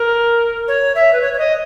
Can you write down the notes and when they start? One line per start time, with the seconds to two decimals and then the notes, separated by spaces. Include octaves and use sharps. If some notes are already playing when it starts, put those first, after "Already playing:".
Already playing: A#4
0.68 C#5
0.95 E5
1.13 B4
1.21 C#5
1.33 C#5
1.38 D#5